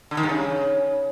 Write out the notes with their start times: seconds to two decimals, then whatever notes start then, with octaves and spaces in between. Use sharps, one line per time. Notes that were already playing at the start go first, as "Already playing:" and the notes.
0.11 D3
0.17 D#3
0.23 G2
0.29 C#3